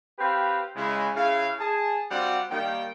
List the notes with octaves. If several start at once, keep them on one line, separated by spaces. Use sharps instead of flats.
C4 G4 B4 F5
C#3 G#3 E4
C#3 E4 F5
G#4 A5
G3 C4 F#4 D5 F5 F#5
D#3 G3 A#3 G5